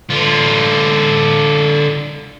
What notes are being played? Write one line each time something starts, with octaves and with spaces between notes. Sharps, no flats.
D3 F4